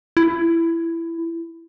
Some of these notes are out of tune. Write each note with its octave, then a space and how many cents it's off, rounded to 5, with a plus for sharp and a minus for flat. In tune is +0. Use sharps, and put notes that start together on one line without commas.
E4 +15